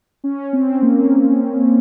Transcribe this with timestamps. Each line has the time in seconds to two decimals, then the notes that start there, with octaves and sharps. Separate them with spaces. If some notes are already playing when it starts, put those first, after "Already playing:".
0.24 C#4
0.53 C4
0.82 A#3